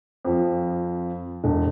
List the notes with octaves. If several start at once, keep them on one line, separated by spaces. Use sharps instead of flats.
F2 F3
E1